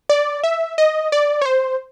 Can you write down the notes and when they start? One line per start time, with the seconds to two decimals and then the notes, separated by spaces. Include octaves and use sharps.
0.09 D5
0.43 E5
0.78 D#5
1.12 D5
1.42 C#5
1.45 C5